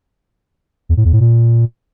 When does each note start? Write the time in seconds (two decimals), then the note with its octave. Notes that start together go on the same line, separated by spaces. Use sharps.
0.89 E2
0.97 A2
1.05 E2
1.13 A2
1.21 A#2